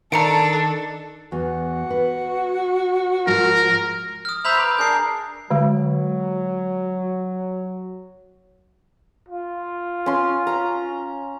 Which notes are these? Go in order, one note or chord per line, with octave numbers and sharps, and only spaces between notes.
D#3 D4 A4 A#5 C#7 D7
E2 F#4
B4
G#2 F3 F4 A#4
D#6 F6
C5 E5 A#5 B5 G6 F7
B4 D6
D4 G#4 A#4 G6 C7
D3 F#3 G#3
F4
C#4 C6
A#5